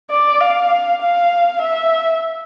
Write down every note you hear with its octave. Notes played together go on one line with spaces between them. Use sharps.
D5
F5
F5
E5